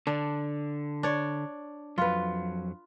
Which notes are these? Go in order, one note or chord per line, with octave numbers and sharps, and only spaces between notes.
D3 D4
D4 C#5
F2 F#3 F4 B4